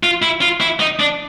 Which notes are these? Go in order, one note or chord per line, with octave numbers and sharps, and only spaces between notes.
F4
E4
F4
E4
D#4
D4